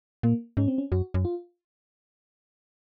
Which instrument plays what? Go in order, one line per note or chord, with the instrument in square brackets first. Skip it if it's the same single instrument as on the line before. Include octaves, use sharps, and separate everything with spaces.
[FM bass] A#2 [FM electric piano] A#3
[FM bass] G#2 [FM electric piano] C#4
[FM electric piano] C4
C#4
[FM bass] F#2 [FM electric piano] F#4
[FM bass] F#2
[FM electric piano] F4